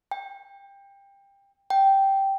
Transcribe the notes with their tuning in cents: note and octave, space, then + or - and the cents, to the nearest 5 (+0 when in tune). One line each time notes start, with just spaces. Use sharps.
G5 +20
G5 -10